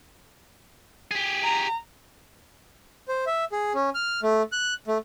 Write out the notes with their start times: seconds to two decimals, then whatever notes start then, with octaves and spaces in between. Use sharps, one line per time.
1.11 G4 G#4
1.43 A#5
3.08 C5
3.26 E5
3.52 G#4
3.75 C#4
3.95 F6
4.23 A3
4.52 F#6
4.87 A3